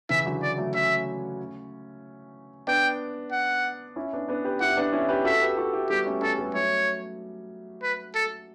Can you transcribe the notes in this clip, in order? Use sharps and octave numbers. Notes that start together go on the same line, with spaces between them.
C#3 E3 E5
D3 F#3
D5
F#3 A3
A3 C#4 E5
B3 D4 G5
F#5
C#4 E4
B3 D4
B3 D4
G4 B4
E4 G4 F#5
B3 D4
C#4 E4
G4 B4
F#4 A4 E5
G4 B4
F#4 A4
E4 G4
G3 B3 G4
A3 C#4
A3 C#4 A4
G3 B3
F#3 A3 C#5
B4
A4